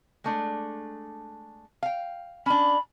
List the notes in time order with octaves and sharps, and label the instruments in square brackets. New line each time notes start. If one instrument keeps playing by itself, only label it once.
[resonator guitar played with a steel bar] G#3 A3 D4
F5 G5
[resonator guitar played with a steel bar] C#4 D4 [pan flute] B5